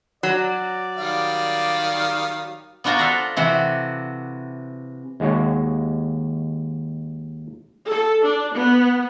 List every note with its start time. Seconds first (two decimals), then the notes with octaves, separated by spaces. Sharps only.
0.23 F#3 D5
0.97 D#3 G3 F5
2.84 B3 D4 F4 F#4 C5 A#5
2.98 A4 C5 F5 A#5 B5
3.37 C3 E3 F#4
5.20 D#2 G#3 F#4 C#5
7.85 A4
8.23 D4
8.52 B3